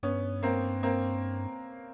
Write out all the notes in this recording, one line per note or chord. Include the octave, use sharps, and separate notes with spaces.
G2 B3 C#4
A#3 C4
A#3 C4